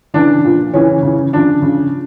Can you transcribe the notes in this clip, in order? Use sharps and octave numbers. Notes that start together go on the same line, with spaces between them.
C#3 E3 D4
A#2 F3
C#3 E3 C#4
C#3 E3
C#3 F3 D4
C#3 F3